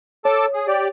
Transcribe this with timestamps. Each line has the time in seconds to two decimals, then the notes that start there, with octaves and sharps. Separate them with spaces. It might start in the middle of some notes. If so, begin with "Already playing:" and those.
0.25 A4 C#5 A5 D6
0.53 G#4
0.67 G4 D5